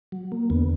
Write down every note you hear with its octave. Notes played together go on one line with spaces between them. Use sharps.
F#3
A#3
E2 D3 B3